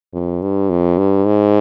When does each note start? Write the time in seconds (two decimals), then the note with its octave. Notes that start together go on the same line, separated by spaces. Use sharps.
0.13 F2
0.42 G2
0.70 F2
0.98 G2
1.26 G#2